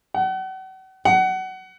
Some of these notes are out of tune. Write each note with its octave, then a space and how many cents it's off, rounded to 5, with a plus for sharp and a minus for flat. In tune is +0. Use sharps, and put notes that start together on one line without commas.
F#5 +40
F#5 +25